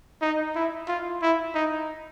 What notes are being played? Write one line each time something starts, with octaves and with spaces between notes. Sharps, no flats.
D#4
E4
F4
E4
D#4